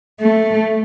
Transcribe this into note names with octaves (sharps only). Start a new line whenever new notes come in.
A3